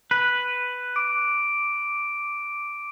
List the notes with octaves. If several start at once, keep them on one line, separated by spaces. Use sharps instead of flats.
B4
D6 D7